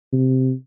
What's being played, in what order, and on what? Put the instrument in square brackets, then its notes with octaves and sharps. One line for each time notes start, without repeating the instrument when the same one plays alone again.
[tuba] C3